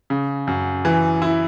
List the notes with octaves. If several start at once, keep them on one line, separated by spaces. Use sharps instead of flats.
C#3
F#2
E3
E4